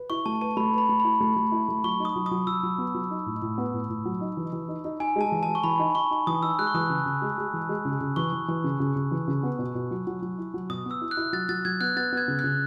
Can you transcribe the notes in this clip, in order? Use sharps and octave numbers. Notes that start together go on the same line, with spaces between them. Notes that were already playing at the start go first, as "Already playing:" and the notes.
Already playing: B4
E4 C#6
A3 A5
B4 A5
A3 B5
B4 B5
A3
E4 B5
A3
A3
E4
A3
F#3 C#6
D#4
D#6
F#3
D#6
F#3
F#3 E6
F#3
B3
F#3
D#4
A2
A2
B3
A2
A2
F#3
D#4
E3
E3
D#4
D#4
D#4 G#5
G#3 A5
E3
A5
G#3
C#6
E3 B5
D#4
D#4 C#6
D#4
E3 D#6
D#4 E6
G#3 F#6
C#6
E3 D#6
C#3
C#3
G#3
G#3
E3
G#3
C#3
C#3
E3 C#6
E3
E3
C#3
C#3
C#3
E3
C#3
B3
B2
B2
F#3
F#3
F#3
E4
F#3
B2 D#6
B3
E6
E4
F#6
E4
F#3 A6
F#3 A6
F#3 G#6
B3 F#6
B3 A6
B3 G#6
C#3
F#6
C#3